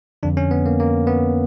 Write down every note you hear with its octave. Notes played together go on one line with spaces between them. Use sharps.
F2 D3 D4
C#4
B3
A#3
A#3
B3